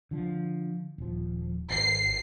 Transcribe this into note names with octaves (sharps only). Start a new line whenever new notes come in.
D3 F3
D#1 F3
G#1 C7